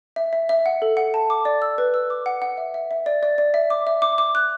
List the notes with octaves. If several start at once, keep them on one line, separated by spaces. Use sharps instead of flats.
E5
E5
E5
F#5
A4
F#5
A5
D6
D5
E6
B4
E6
D6
F#5
F#5
E5
E5
E5
D5
D5
D5
E5
D6
E5
D6
D6
F#6